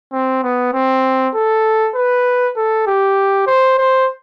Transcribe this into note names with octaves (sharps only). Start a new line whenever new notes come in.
C4
B3
C4
A4
B4
A4
G4
C5
C5